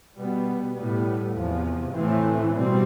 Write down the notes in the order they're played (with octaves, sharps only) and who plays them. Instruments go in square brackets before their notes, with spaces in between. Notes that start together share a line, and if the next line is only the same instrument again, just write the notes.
[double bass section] B2 G3 B3
A2 G3 B3
E2 C3 F3
A2 E3 A3 C4
B2 G3 C4